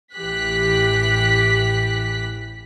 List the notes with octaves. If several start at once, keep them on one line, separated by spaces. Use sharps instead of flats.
A1 E3 G4 F#6 B6